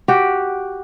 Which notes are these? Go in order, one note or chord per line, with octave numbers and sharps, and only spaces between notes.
F#4 G4